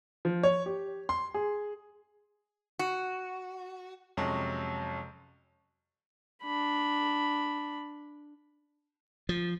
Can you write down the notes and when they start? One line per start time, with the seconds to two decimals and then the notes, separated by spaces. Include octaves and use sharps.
0.25 F3
0.43 C#5
0.66 G4
1.09 C6
1.34 G#4
2.79 F#4
4.17 F2 C3 F#3 G#3 C#4
6.43 D4 B5
9.29 F3